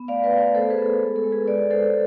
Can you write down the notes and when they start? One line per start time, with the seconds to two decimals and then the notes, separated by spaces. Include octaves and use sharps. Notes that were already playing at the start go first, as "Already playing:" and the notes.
Already playing: B3
0.08 A3 D5 F5
0.24 B4 D5
0.32 A3
0.39 B4 D5
0.54 B3 A4 C5
0.70 G#4 B4
0.78 B3
0.86 A4
1.01 G#3
1.16 A4
1.24 G#3
1.32 G#4 B4
1.47 G#3 B4 D5
1.71 G#3 A4 C5